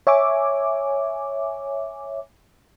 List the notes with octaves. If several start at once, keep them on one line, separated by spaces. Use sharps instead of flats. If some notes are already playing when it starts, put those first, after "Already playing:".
C#5 E5 G#5 D6